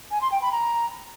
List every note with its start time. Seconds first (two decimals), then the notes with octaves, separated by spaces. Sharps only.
0.11 G#5
0.21 C6
0.32 G5
0.42 B5
0.52 A#5